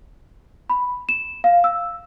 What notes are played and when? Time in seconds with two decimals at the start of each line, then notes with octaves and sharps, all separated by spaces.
0.70 B5
1.09 E7
1.44 F5
1.64 E6